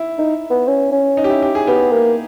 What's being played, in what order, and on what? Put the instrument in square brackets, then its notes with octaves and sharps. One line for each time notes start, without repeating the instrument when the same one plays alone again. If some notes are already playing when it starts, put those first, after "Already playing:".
Already playing: [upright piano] E4
[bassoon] D#4
B3
C#4
C#4
[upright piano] D#4
G4
E4
G4
G#4
[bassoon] B3 [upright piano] G4
[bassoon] A#3